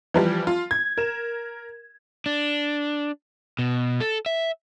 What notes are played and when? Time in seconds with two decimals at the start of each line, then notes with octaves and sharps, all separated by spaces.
0.14 E3 F3 G3
0.47 F4
0.71 G#6
0.98 A#4 E7
2.26 D4
3.59 B2
4.01 A4
4.26 E5